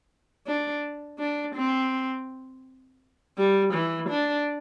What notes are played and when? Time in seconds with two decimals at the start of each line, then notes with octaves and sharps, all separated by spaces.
0.47 D4
1.19 D4
1.55 C4
3.37 G3
3.74 E3
4.10 D4